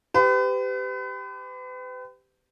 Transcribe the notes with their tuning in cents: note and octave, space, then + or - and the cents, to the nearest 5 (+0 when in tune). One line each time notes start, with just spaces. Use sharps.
G4 +0 B4 +40